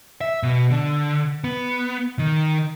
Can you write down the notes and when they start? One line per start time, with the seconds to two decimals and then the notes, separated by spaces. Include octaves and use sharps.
0.21 E5
0.43 B2
0.71 D3
1.44 B3
2.19 D#3